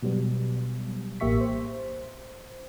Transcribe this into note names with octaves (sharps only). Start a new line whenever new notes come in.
B2 F#3 G3 B3
A1 A#3 G4 E5 C#6 B6
C5